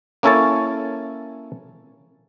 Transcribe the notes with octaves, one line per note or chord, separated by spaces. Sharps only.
A#3 C#4 E4 A4 C#5 A5